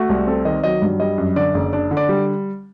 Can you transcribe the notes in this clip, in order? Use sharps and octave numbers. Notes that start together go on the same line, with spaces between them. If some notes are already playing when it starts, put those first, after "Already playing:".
Already playing: A3 F#4
C2
C4 A4
D#3 D#5
F#3 D#5
G2
G3 D#5
F#2
D3 D5
F#1
D4 D5
D3
D5
G3